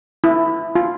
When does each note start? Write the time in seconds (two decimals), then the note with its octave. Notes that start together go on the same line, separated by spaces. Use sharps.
0.24 E4
0.75 F4